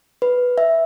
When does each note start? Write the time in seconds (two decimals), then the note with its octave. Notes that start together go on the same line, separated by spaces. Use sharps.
0.22 B4
0.58 E5